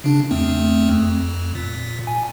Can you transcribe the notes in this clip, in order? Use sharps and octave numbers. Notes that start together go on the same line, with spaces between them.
C#3 D4
E2 A3 C4
F2
A#2
G#5